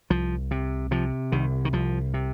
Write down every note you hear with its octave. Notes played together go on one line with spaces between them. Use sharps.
C2 F3
C3
C3 F3
C2 D#3
D#3
C2 F3
C3